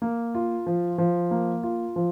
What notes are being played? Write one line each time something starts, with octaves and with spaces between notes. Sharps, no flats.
A#3
F4
F3
F3
A#3
F4
F3